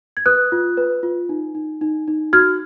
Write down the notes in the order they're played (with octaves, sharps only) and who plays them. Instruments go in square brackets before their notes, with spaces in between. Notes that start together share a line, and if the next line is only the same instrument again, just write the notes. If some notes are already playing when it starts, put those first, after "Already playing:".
[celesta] G#6
B4 D#6 F#6
F4
B4
F4
D#4
D#4
D#4
D#4
F#4 F6 G#6